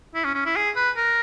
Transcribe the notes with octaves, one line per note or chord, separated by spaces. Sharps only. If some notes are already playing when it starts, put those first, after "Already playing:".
E4
C#4
C#4
E4
G#4
B4
A#4